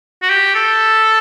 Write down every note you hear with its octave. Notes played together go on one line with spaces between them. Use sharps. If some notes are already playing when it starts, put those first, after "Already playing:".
F#4
G4
A4